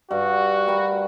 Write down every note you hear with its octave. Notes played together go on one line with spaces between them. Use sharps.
G2 F#4
A#4 G5 B5